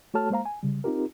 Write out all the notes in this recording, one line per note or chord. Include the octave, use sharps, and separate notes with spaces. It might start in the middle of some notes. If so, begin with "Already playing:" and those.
A3 F#4 A4 C#5 A5 F6
G#3 A#3 C5 F5 A#5
G#5
C#3 G3
C4 D#4 F4 G4 A#4